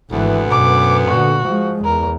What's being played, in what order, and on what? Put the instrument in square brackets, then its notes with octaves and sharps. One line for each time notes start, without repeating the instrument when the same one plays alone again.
[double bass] G#1 E3 [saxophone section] D2 B3
[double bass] F#2 B2 [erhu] D6
[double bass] A#2 D3 [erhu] F#4
[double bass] F3 G#3
[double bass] E2 [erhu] A#4